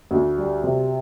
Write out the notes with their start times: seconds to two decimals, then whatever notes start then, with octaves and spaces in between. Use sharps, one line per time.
0.11 D2
0.37 G3
0.63 C3